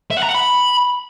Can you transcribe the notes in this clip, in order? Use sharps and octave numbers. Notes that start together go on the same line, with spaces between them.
E5
F#5
A#5
F#5
B5